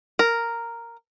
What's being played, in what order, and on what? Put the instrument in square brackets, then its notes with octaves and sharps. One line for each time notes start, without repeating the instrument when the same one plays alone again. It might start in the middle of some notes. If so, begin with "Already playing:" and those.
[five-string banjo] A#4